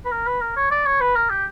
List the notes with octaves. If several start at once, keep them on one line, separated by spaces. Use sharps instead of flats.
B4
A#4
B4
A#4
C#5
D5
C#5
B4
A#4
G4